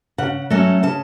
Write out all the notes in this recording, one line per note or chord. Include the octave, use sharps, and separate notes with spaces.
C#3 F#5
F#3 A3 C#4
C#3 A5